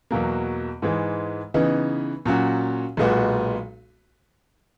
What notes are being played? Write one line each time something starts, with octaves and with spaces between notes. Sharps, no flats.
E2 B2 F#3 A#3
G#2 E3 G#3
C#3 E3 B3 D#4
A#2 F#3 C#4 F#4
B1 A#2 G#3 B3 F#4